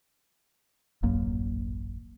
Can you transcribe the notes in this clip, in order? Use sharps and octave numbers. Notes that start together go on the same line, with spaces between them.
D#1 A1 F#2 A#3